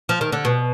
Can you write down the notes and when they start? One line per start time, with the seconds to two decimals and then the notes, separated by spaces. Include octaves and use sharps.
0.09 F3
0.21 D#3
0.32 D3
0.45 B2